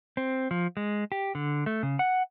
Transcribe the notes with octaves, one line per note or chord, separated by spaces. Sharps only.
C4
F3
G#3
G4
D3
A3
C#3
F#5